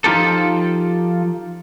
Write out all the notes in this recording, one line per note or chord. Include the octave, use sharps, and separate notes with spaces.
F3 D#4 F4 G4 A4